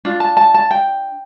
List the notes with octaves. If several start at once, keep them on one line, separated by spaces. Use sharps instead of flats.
D4 F4
A5
A5
A5
G5